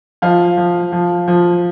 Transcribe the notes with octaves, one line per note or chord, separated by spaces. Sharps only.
F3 F5
F3
F3
F3